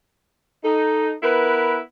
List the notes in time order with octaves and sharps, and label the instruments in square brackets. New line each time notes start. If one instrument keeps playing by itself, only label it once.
[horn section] D#4 [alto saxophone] A4
[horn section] B3 E4 B4 [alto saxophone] A#4